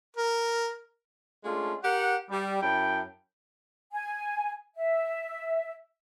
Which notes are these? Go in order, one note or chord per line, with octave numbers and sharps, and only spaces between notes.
A#4
G#3 A3 C#4 D4 F4
G4 A#4 F#5
G3
F#2 E4 G5 A5 B5
G#5
E5